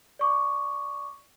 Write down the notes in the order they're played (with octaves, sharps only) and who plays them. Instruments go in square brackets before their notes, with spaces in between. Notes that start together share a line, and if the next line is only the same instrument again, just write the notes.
[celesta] D5 C#6 D6